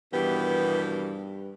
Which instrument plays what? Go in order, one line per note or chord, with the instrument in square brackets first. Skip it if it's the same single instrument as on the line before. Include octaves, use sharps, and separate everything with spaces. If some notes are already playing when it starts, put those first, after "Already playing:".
[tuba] G2 [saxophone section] B2 D#3 E3 [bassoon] B3 [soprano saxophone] G4